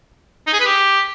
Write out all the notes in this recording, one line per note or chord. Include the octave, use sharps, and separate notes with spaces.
D#4
G#4
B4
G4